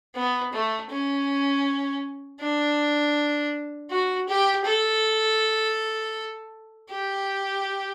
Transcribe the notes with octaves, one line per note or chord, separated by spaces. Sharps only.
B3
A3
C#4
D4
F#4
G4
A4
G4